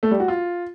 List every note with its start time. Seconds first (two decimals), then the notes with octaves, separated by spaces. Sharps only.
0.03 A3
0.11 G3
0.20 F#4
0.28 F4